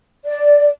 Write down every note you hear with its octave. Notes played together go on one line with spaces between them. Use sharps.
D5